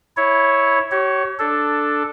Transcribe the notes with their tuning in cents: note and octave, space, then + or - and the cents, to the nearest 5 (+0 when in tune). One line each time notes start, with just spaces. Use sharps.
E4 -10 C#5 +0
G4 -45 C#5 +0
D4 +5 A4 +0